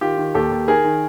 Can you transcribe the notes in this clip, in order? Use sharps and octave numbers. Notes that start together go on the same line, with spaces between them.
D#3 F4 G4
D#3
D#2 G4 A4
D#2
D#3 G#4 A#4
D#3